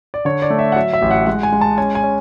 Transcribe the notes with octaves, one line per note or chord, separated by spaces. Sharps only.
D5
D3 C#5
D5
A3
E5
F#5
F#3 E5
E5
A1
F#5
G#3 F#5
G#5
G#3
A5
C#4 G#5
G#5
C#4